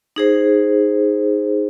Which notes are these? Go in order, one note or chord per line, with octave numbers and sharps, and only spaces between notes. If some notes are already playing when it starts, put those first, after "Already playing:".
D#4 G#4 C5